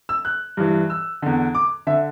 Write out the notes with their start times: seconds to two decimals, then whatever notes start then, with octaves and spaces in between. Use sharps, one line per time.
0.09 E6
0.25 F#6
0.57 G2 E3
0.90 E6
1.22 E2 D3
1.55 D6
1.87 D3 E5